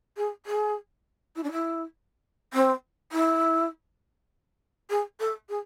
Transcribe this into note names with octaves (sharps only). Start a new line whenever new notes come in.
G#4
G#4
E4
D4
E4
C4
E4
G#4
A4
G#4